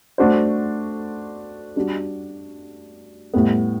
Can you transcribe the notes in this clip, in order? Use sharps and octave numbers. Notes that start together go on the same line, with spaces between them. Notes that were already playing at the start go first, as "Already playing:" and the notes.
A3 D4 F#4 C5
G3 D4 F#4
A2 G3 B3